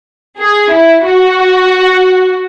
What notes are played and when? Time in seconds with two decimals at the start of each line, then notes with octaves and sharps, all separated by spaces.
0.38 G#4
0.71 E4
1.05 F#4